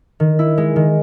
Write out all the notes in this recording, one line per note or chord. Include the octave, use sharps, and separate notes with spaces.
D#3
E4
G#3
D#3